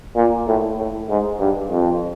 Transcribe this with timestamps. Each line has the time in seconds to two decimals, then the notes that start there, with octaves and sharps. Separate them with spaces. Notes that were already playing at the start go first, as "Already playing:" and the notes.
0.16 A#2
0.47 A2
0.78 A2
1.09 G#2
1.39 G2
1.71 F2